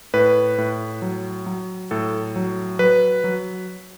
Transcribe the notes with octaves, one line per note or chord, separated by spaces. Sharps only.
A2 B4
A2
F#3
F#3
A2 A4
F#3
F#3 B4
F#3